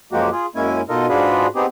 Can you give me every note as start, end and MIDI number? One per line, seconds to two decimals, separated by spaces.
0.12 0.30 42
0.12 0.30 53
0.12 0.30 56
0.12 0.30 58
0.12 0.30 66
0.12 0.30 67
0.32 0.46 65
0.32 0.46 68
0.56 0.81 42
0.56 0.81 56
0.56 0.81 58
0.56 0.81 61
0.56 0.81 64
0.56 0.81 80
0.89 1.07 47
0.89 1.07 63
0.89 1.07 65
0.89 1.07 69
0.89 1.07 70
0.89 1.07 75
1.09 1.47 44
1.09 1.47 62
1.09 1.47 65
1.09 1.47 66
1.09 1.47 68
1.09 1.47 71
1.55 1.66 59
1.55 1.66 60
1.55 1.66 63
1.55 1.66 67
1.55 1.66 68